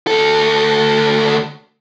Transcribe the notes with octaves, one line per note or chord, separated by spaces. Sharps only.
D2 A4